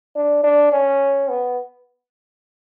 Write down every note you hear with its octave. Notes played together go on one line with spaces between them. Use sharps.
D4
D4
C#4
B3